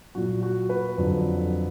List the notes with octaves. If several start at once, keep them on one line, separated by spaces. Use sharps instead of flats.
A#2 F#3 F#4
F#4
B4
F2 D3 F#3